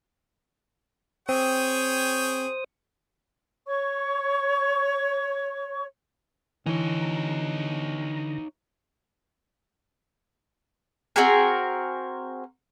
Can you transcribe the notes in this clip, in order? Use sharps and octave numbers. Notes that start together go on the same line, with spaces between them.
C4 G#4 C5 C#5 G5 D#6
C#5 C#6
D3 E3 D#4 C#5 A#5
C4 F#4 G#4 A#4